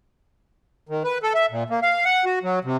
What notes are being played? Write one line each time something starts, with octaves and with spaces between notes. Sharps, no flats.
D#3
B4
A4
E5
A#2
A#3
F5
F#5
F#4
F#3
C3